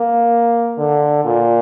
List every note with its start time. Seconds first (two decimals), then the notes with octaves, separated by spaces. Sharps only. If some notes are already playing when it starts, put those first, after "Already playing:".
Already playing: A#3
0.78 D3
1.25 A#2